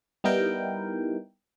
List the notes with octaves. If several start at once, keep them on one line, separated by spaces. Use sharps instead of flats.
G3 B3 D#4 E4 A#4 G5